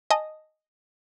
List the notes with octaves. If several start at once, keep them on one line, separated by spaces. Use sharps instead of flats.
D#5 G#5 A5 D#6